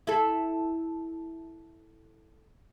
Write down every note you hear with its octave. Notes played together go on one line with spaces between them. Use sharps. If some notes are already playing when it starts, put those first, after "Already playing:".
E4 A4